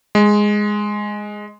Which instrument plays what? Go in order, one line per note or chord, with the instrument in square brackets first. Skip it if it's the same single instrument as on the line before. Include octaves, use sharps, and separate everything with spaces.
[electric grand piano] G#3